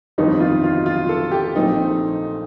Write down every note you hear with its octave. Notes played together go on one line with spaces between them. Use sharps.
G1 F2 D#3 G3 D#4
F4
F4
F4
A4
G4
A#1 A#2 A3 C4 D#4